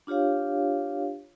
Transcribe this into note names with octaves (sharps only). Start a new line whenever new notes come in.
D4 F4 G4 C#5 F5